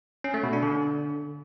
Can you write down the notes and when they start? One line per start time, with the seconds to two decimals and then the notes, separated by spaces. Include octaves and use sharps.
0.24 C#4
0.34 A3
0.43 B2
0.53 D4
0.62 D3